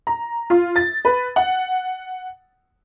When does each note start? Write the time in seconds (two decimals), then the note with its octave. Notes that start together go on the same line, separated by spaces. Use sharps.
0.07 A#5
0.50 F4
0.76 A6
1.05 B4
1.36 F#5